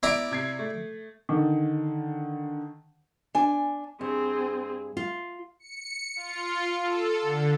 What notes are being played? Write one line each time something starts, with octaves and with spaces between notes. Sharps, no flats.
B3 E4 D5 A#5 D7
C3 G#6 C7
A3
D3 D#3
D4 G#5
G2 C4 G#4
F4
C#7
F4
A4
D3